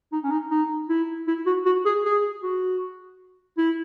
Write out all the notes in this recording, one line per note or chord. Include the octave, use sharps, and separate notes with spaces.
D#4
C#4
D#4
D#4
E4
E4
F#4
F#4
G#4
G#4
F#4
E4